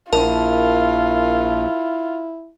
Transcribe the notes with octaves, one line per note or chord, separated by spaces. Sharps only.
A#1 E4 F4 A#4 A5